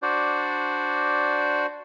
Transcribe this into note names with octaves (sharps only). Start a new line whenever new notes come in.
D4 F#4 C5 D5